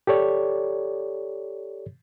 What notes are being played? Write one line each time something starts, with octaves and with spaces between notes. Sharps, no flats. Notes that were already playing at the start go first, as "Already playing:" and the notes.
G4 A4 C#5 D5